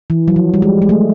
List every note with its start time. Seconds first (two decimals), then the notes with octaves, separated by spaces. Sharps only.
0.10 E3
0.28 F#3
0.36 F3
0.54 G3
0.62 G#3
0.82 G#3
0.89 A3